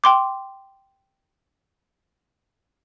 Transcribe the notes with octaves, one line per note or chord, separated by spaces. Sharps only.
G5 C6 D6